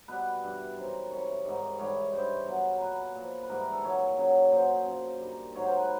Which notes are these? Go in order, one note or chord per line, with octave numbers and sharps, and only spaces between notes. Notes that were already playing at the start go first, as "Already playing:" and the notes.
B2 G3 B4
G2 E3 G3
F#2 D#3 G3 C5
C3 E3 G3 C#5
G#2 D#3 G3
G#2 E3 G3 C#5
G2 E3 G3 C5
B2 F#3
A#4
A#2 F#3 B4
A#2 F3
B4
G#2 E3 G3 A#4
A#4
A4
A#2 F#3 C#5
F#2 C#3 F#3
A#2 F#3 C5
C5
F#2 C#3 F3
G2 D#3 G3
G#2 D#3 F#3 C#5
C5
A#4
B4